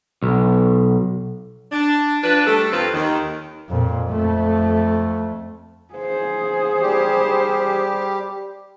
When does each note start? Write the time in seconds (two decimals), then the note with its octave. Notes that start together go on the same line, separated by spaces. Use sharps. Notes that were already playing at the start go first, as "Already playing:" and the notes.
0.22 B1
1.72 D4
2.23 F3 D4 B4
2.47 G3 A3 D4 A4
2.72 F2 D#3 C4 F4 B4 C5
2.94 D#2 D#3
3.69 F2 A#2
4.09 F2 A3
5.95 G#4 C5
6.81 G3 G4